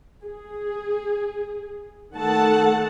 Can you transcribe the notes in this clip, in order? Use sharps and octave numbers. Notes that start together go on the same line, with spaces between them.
G#4
D#3 A3 A4 F#5 A5